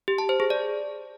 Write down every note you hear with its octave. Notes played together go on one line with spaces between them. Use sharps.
G4
A5
C5
G#4
D5